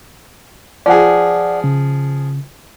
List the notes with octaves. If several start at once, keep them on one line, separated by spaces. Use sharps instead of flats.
F3 G#4 D5 F#5
C#3